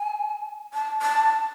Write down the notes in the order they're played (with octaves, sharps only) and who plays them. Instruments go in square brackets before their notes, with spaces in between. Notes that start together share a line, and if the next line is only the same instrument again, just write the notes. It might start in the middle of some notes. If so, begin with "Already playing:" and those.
Already playing: [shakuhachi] G#5
A5
A5